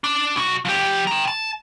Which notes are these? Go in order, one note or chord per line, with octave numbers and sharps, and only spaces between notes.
D4
B1 F#4
F3 G4
G5 A#5
A5